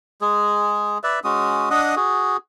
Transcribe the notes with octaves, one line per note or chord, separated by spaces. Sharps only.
G#3 G#4
B4 D5 E5
G#3 C#4 F#4 D#6
D4 D#5 F#5 D#6
F#4 G#4